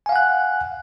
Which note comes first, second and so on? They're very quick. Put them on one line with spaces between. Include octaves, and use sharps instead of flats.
G#5 F5 F#5 F#6